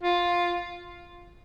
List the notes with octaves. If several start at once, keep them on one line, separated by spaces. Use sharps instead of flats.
F4